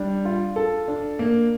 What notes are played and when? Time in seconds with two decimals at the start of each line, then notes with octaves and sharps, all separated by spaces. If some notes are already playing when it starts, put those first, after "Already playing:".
Already playing: G3 D4
0.25 F4
0.56 A4
0.88 D4
1.19 A#3